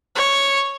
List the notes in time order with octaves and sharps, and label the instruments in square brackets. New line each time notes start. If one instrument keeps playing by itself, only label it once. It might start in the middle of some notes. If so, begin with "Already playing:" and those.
[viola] C#5